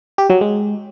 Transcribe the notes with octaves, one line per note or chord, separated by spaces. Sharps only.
G4
F#3
G#3